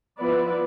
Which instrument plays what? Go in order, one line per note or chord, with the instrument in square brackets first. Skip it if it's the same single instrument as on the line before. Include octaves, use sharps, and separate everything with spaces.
[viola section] F3 B3 E4 B4 D5